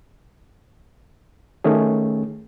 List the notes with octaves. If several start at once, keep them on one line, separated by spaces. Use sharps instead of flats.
D#3 A3 C#4 G#4